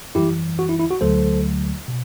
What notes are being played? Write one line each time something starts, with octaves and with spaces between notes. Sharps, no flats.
F#2 E3 G3 E4 G4
F#4
E4
E4
F#4
D2 D3 F#3 A3 A4 C5
B2